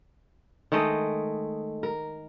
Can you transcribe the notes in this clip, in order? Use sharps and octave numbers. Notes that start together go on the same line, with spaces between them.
D#3 G#3 A3 D#5
A#4